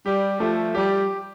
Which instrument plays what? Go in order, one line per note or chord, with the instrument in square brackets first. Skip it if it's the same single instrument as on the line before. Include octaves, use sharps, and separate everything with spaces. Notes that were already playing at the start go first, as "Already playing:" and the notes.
[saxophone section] G3 [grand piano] G4
[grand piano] F3 [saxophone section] A3
[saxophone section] G3 [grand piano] G4